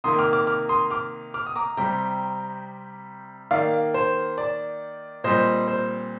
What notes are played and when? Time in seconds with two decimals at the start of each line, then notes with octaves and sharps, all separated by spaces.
0.04 C3 D#3 A#3 C6 D#6
0.19 D6 F6
0.33 D6 F6
0.47 D6 F6
0.69 C6 D#6
0.90 D6 F6
1.34 D6 F6
1.47 D#6
1.56 A#5 D6
1.77 C3 G3 C4 G5 A#5
3.51 D#3 A#3 D5 F5
3.94 C5
4.38 D5
5.24 A#2 G3 C4 C5 D#5
5.68 C5